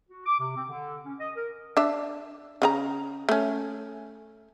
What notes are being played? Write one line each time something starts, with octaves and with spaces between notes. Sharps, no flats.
F#4
D6
C3
C4
D3
C#4
D#5
A#4
D4 E5
C#3 F#4 A#5
A3 C#4